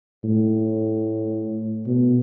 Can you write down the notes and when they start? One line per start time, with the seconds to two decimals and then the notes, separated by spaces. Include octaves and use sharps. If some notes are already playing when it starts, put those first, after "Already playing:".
0.24 A2
1.86 B2